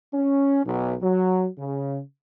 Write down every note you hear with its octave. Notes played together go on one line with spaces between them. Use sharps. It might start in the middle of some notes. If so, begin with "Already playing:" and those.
C#4
B1
F#3
C#3